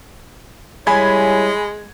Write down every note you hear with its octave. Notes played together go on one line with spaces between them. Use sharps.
G3 G#3 E4 C#5 G#5 B5 G#6